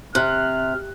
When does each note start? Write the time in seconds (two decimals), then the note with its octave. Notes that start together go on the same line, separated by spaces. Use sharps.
0.15 C3 F6 F#6